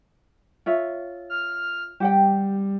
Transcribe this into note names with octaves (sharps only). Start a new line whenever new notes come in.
F4 C#5 E5
F6
G3 G4 F#5 G5